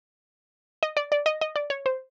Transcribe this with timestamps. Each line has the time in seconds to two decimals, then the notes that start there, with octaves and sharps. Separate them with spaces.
0.83 D#5
0.97 D5
1.12 D5
1.26 D#5
1.41 D#5
1.56 D5
1.70 C#5
1.86 C5